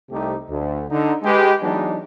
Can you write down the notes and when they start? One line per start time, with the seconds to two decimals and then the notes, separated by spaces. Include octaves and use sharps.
0.10 C2 C3 A3 D#4 G4
0.48 D2
0.89 D3 D#4
1.23 G#3 G4 B4
1.61 E3 F#3 G#3 B3 D4 D#4